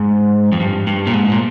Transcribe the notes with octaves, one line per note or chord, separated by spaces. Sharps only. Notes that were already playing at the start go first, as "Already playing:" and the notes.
Already playing: G#2
F2
G2
G2
A#2
G#2
A#2